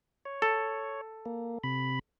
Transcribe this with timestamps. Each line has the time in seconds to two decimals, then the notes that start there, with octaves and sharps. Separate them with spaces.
0.25 C#5
0.42 A4
1.26 A#3
1.64 C3 B5